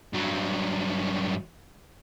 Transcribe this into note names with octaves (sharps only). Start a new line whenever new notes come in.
G2 F#3